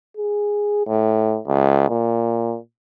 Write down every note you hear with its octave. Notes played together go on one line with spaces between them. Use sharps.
G#4
A2
C#2
A#2